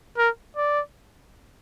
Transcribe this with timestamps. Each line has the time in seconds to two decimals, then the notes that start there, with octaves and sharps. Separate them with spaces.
0.18 A#4
0.57 D5